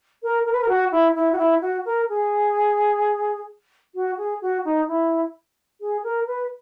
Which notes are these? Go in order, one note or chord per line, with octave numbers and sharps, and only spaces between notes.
A#4
A#4
B4
A#4
F#4
E4
E4
F#4
E4
F#4
A#4
G#4
F#4
G#4
F#4
D#4
E4
G#4
A#4
B4